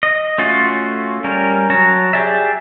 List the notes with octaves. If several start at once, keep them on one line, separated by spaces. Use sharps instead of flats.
D#5
A3 C#4 F4 F#4
G3 C#4 A#4
F#3 C#5 A5 A#5
G4 G#4 D5 E5